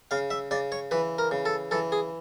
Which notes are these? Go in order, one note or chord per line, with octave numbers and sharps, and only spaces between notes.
C#3 F5
E5
C#3 D5
C#5
E3 B4
A#4
C#3
A4
E3 A4
G#4